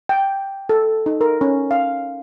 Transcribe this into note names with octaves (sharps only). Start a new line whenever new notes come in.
G5
A4
D#4
A#4
C#4
F5